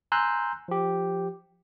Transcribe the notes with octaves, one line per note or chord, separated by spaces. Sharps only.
G#5 A#5 C6 E6 F#6 G6
F3 G4